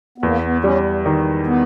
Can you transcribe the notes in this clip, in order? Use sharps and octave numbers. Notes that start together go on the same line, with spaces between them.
B3
E2 A#3
B3
G3 C#4
D#3
B3